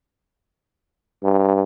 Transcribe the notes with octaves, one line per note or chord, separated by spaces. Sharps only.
G2